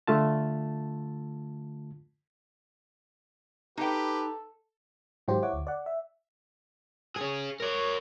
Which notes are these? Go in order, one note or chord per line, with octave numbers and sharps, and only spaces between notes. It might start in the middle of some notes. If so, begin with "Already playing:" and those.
D3 A3 F4 A5
D#4 G4 A4 B4 G5
G#2 D#3 F#3 F4 G4 C5
E4 C#5 F#5 D6
D2
D5 F#5
E5
C#4 G#4
A#4 C#5